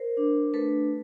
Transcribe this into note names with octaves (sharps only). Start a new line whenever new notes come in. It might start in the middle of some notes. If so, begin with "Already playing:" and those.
Already playing: A#4 C5
D4
A3 A4 B4